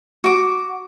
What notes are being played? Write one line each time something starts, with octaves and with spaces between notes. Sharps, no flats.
F#4 D6